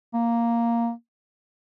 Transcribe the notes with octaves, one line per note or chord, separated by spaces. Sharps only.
A#3